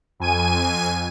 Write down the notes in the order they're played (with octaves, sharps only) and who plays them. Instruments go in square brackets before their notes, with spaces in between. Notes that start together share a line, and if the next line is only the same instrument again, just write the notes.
[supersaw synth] F2 G#5 D#7